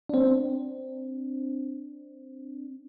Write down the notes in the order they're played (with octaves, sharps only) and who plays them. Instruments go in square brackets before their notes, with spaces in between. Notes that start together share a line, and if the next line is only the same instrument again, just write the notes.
[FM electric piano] C4 D4